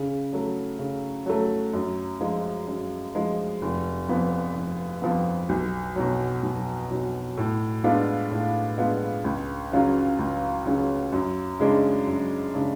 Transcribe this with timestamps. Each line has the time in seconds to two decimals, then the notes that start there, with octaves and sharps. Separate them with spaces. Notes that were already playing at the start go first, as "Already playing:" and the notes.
Already playing: C#3
0.33 F#3 A3
0.79 C#3
1.26 F#3 A3
1.73 F#2
2.20 F3 G#3
2.67 F#2
3.15 F3 G#3
3.62 F1
4.08 F2 F3 B3
4.55 F1
5.02 F2 F3 B3
5.49 B1
5.96 B2 F#3
6.43 B1
6.91 B2 F#3
7.37 A2
7.84 G#3 B3 D4 F4
8.31 A2
8.78 G#3 B3 D4 F4
9.24 C#2
9.72 C#3 F#3 C#4 F4
10.19 C#2
10.65 C#3 F#3 C#4 F4
11.12 F#2
11.60 C#3 G#3 D4
12.07 F#2
12.54 C#3 G#3 D4